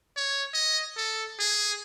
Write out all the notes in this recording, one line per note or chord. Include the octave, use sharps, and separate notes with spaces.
C#5
D#5
A4
G#4